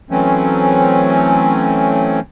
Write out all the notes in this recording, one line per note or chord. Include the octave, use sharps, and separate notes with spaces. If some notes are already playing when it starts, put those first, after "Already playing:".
E3 F#3 A3 C4 C#4